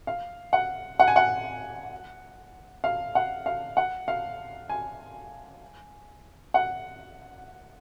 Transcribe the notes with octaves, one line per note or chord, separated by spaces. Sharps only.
F5
F#5
F#5
G#5
F#5
F5
F#5
F5
F#5
F5
G#5
F#5